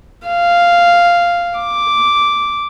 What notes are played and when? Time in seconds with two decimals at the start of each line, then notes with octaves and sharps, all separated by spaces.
0.27 F5
1.58 D6